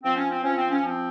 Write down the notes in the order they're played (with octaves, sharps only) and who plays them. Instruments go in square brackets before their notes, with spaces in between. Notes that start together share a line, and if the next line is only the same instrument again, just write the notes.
[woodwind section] F3 C4
C#4
C4
F3 C#4
C4
C#4
F3 C4